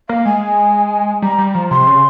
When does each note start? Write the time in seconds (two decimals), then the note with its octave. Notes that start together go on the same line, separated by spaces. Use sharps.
0.09 A#3 F5
0.25 G#3 G#5
1.22 G3 A#5
1.38 G3
1.55 F3
1.70 C3 C6
1.87 C#3